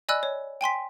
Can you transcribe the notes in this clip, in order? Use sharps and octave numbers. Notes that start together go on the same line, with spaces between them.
D5 D#5 G#5 B5 E6 F#6
C#5
G5 G#5 C6 B6